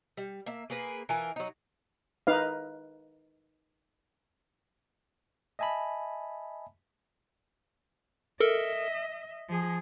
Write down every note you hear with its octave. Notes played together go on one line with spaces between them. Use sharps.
G3
A#3 E5
A#3 G#4 A#4 B4
E3 F4 A#4 G#5
F#3 D#4
D#4 B4 F5
D#5 E5 G#5 A5 B5
A4 A#4 D#5 E5
F3 G#4